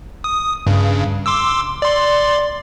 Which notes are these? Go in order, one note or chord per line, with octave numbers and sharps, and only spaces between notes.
D#6
G2 C#3
C6 D6 E6
D5 C6